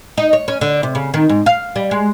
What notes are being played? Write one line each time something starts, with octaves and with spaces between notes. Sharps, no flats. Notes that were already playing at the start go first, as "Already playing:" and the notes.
D#4
C#5
C#4
D3
C3
C#3
D#3
G#2
F5
G3
G#3